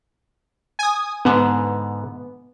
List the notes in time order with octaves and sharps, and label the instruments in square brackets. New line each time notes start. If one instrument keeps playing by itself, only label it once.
[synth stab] G#5 D#6
[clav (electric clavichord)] G#2 D3 [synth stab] B3